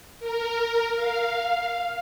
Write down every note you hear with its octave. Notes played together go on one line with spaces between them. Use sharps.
A#4
F5